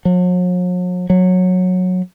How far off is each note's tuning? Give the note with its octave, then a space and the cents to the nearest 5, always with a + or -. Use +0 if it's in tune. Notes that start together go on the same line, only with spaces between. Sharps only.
F#3 -45
F#3 -15